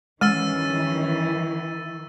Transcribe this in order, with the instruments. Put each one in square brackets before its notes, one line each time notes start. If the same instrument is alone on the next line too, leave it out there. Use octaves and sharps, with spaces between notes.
[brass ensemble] G2 C#4 [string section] D#3 E3 [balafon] G#3 [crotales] E6 A6 D#7